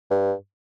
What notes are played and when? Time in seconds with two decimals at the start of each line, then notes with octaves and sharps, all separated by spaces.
0.11 G2